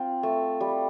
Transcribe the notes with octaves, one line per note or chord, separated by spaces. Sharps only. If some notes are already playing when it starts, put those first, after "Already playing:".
Already playing: C4 F4
A3
G3